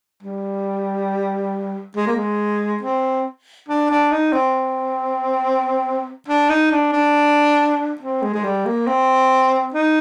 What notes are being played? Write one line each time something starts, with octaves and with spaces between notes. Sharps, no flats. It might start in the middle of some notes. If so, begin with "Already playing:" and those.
G3
G#3
A#3
G#3
C4
D4
D4
D#4
C4
D4
D#4
D4
D4
C4
G#3
G#3
G3
A#3
C4
D#4